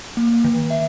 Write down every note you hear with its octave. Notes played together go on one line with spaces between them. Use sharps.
A#3
D#3
E5